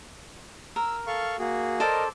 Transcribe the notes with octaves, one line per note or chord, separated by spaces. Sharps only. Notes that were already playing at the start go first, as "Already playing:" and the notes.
A#4 E6
A4 F5 C#6
A#3 F#4 G#4
A4 A#4 C5 D5 D#5